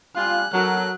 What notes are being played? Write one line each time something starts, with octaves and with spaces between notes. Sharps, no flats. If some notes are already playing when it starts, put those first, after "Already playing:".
G3 F4 F5 G#5 F#6
F#3 A4 A#4 F#6